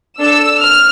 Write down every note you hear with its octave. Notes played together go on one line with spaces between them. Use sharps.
D4 A4 E6
F6